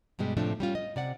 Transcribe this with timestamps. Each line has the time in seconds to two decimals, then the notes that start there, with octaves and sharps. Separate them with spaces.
0.19 G2 B2 G3 G#3
0.37 A2 C3 F3 A3 D4
0.60 G3 C#4 F4
0.75 D#5
0.96 C3 D5 F#5